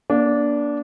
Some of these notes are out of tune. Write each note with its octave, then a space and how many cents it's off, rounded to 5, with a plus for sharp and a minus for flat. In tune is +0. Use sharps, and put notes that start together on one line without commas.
A#3 +35 D4 -15